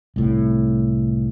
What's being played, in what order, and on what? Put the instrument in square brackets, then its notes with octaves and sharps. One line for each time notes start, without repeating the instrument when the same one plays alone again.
[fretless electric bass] C2 A2